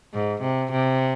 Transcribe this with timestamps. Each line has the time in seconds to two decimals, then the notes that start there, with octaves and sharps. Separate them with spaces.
0.14 G#2
0.42 C3
0.71 C3